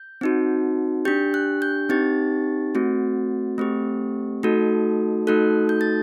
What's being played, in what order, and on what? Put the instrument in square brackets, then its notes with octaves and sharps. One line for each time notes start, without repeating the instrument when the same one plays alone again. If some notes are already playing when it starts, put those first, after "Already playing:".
Already playing: [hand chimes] G6
C4 D#4 F#4
D4 G4 G6
F#6
G6
C4 D#4 G4 A6
A3 C4 F#4
A3 C4 G4
A3 D#4 F#4 A4
A3 D#4 F#4 A4 F#6
G6
A6